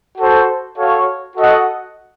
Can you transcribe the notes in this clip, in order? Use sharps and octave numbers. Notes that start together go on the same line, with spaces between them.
F#4 A4 C5
F#4 A4 C#5 F5
F#4 A4 D#5 F#5